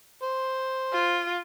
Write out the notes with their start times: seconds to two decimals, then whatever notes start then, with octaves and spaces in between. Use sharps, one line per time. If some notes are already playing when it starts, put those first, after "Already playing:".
0.23 C5
0.93 F4